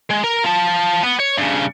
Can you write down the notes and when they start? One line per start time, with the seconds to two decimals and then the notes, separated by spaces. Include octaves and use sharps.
0.10 G#3
0.24 A#4
0.44 F4 A5
1.03 B3
1.19 C#5
1.38 G2 C#3